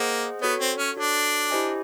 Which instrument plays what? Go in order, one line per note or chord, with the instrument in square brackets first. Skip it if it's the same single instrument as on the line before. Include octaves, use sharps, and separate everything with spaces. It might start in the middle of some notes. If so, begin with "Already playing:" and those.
Already playing: [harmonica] A#3 [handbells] G#4 C5 D#5 F#5
[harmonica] B3 [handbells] F#4 A4 C#5
[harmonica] C4
C#4
[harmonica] D4 [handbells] F#4 A4 C#5
[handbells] E4 G4 C5 D#5 G#5